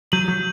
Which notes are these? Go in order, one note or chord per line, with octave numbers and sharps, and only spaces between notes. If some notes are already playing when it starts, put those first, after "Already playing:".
F#3 G6 D#7 F#7
F#3